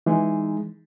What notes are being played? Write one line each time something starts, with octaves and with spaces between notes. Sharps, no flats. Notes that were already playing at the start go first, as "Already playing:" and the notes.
E3 G#3 D#4 G#4